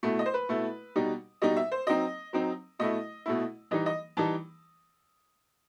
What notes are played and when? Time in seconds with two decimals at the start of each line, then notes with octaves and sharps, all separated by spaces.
0.03 B2 A3 E4
0.19 D#5
0.26 C5
0.34 B4
0.49 B2 A3 E4
0.96 B2 G3 D#4
1.42 B2 G3 D#4 D#5
1.56 E5
1.72 C5
1.87 F#3 C4 D#4 D#5
2.33 F#3 C4 D#4
2.79 B2 A3 E4 D#5
3.26 B2 A3 E4
3.71 E3 G3 D#4 D#5
3.86 D#5
4.17 E3 G3 D#4 A5